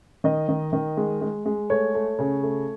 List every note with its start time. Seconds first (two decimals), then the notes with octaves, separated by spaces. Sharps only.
0.24 D#3 D#5
0.49 D#3
0.73 D#3
0.97 G#3
1.21 G#3
1.46 G#3
1.70 A3 C#5
1.95 A3
2.19 C#3
2.43 A3